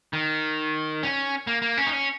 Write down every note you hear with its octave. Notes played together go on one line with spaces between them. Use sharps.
D#3
C#4
A#3
A#3
C#4
D#4
C#4